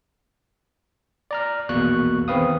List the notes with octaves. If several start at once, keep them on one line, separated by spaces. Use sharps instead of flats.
D5 A#5 F6
A#1 E2 B2 A#3 C#6 F#6
E2 D#3 C4 B4 F5 D#6